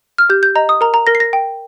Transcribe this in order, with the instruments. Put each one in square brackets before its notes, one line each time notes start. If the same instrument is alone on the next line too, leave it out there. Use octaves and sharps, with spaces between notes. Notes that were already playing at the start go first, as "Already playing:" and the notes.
[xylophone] F6
G4 G6
G6
D#5 A#5
D#6
A#4 A#5
A#5
A#4 A#6
C7
A#6
G5